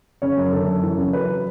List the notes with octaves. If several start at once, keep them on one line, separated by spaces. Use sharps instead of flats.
C#3 C#5
F#2
D3 A4
F#2
E3
C#3
F#3 B4